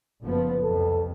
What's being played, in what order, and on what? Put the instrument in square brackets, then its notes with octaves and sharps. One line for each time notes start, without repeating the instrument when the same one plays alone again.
[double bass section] F#1 F3 B3
[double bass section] C2 F2 [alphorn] A4